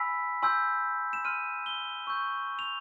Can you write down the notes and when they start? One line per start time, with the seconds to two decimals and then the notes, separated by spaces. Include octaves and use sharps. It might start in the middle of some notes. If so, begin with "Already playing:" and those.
Already playing: G#5 B5 E6 B6
0.42 G#5 C6 E6 G6
1.13 E7
1.25 C6 F6 D#7
1.66 G7
2.07 C#6 E6 G6
2.59 F7